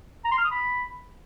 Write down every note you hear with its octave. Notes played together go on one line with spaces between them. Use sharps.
A#5
C6
F6
D#6
B5